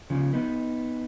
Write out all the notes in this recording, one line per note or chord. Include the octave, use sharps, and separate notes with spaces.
C#3 F3
B3 D#4